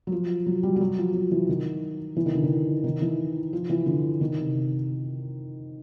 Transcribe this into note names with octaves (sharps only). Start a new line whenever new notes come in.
F#3
F3
F#3
G3
G3
F#3
F3
F3
E3
D#3
E3
D#3
D3
D#3
D#3
E3
F3
E3
D3
D#3
C3